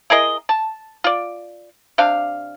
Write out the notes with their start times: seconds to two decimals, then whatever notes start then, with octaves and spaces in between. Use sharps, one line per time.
0.10 E4 G#4 A#4 D#5
0.49 A5
1.04 F4 D5
1.98 C3 D4 F5